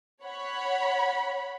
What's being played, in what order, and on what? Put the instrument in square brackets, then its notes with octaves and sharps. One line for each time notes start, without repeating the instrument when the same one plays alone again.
[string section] C#5 F#5 B5